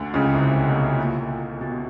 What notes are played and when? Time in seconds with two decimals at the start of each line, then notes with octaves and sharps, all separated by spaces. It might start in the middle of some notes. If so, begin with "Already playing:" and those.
Already playing: D2 D3
0.14 C#2 C#3
0.34 C2 C3
0.66 B2
0.99 A#2
1.61 B2